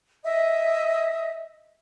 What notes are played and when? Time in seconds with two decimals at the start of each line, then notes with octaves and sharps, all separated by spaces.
0.24 D#5 E5 D#6